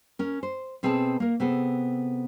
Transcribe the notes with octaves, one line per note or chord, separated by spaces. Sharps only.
C#4 A#4
C5
B2 C4 G#4 A4 G#5 A5
A#3 A#4
C3 B3 G#4 A4